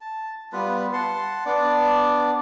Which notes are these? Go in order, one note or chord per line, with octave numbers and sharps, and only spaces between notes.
A5
G3 B3 F4 B4
F#5 A5 C6
B3 D4 D5